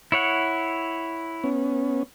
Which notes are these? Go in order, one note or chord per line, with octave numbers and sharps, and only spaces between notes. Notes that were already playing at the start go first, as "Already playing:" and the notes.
E4 C#5 F#5
B3 C#4